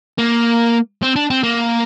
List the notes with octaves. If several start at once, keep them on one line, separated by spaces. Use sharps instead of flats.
A#3
C4
D4
C4
A#3